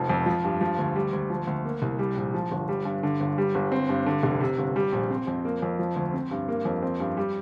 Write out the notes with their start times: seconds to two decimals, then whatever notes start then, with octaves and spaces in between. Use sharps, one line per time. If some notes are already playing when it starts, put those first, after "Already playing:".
Already playing: F1 F3
0.10 F2
0.26 F3
0.44 G2
0.61 F3
0.78 D2
0.96 G3
1.13 D2
1.30 F3
1.47 D2
1.65 A#3
1.82 C2
1.99 G3
2.16 A#1
2.34 F3
2.51 G1
2.69 G3
2.85 G2
3.03 D3
3.20 G1
3.38 G3
3.55 G1
3.72 C4
3.89 G2
4.06 D3
4.23 F1
4.40 C3
4.58 G1
4.76 G3
4.92 A#1
5.11 C4
5.27 F2
5.45 A#3
5.62 F2
5.79 F3
5.96 D2
6.14 C4
6.31 G2
6.48 A#3
6.65 F2
6.82 C4
7.00 G2
7.17 G3